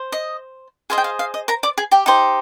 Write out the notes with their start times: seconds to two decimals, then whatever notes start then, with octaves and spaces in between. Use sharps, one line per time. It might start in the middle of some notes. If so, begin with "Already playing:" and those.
Already playing: C5
0.12 D#5
0.90 G#4 C5 D#5 F5
0.98 G5
1.04 F5
1.19 F5
1.34 D#5
1.48 A#4 A#5
1.63 D5 D6
1.78 G#4 G#5
1.92 G4 G5
2.06 D#4 G4 C5